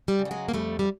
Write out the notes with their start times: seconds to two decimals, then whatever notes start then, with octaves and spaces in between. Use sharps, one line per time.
0.08 G3
0.19 C#3
0.25 G3
0.31 F#3 G#3
0.49 A#3
0.53 F2 G3 A3
0.79 G3